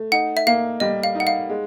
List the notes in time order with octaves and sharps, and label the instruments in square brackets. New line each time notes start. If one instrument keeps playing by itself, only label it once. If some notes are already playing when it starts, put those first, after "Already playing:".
Already playing: [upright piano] A3
[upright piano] D#4 [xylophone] F#5
[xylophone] E5
[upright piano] A#3 [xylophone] F5
[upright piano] G3 [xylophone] D#5
[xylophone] F5
[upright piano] D#4
[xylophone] F#5
F5
[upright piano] G#3